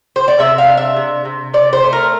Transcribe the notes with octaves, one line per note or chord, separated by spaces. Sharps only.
C5
D5
C3 E5
F5
D4
E5
C3
C3
C3 D5
C5
A3
A#4